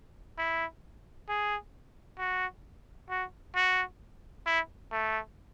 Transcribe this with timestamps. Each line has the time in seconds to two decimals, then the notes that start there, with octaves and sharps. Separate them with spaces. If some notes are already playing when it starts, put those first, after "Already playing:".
0.38 E4
1.29 G#4
2.19 F#4
3.10 F#4
3.55 F#4
4.46 E4
4.92 A3